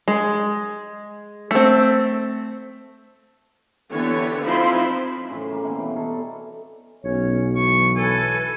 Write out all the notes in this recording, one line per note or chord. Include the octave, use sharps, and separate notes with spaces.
G#3
A3 C4
D3 E3 B3 G4 A4 C#5
F3 C4 D#4 E4 B5 C6
F#2 A2 C#3 E3
A#3 G#5
B2 E3 C4 F5
E3 G3
D#4 A4 C#5 F5
B1 C#4 C#5
E3 F#3 C#6
A4 B4 G#5